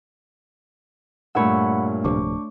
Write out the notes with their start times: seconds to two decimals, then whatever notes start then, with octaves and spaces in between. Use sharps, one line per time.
1.35 G2 A#2 A3 C#5 F#5 B5 E6
2.04 D1 C3 F3 D4 C#6 D6